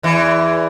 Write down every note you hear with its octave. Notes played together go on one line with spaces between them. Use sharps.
E2 E3